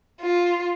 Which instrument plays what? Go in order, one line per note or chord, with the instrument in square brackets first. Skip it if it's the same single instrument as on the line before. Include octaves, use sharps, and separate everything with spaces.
[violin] F4